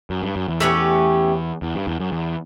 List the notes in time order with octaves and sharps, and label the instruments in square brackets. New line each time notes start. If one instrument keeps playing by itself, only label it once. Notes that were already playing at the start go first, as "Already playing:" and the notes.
[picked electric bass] F#2
G2
F#2
E2
[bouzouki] A3 C#4 G4 B4
[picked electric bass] E2
G2
E2
F#2
E2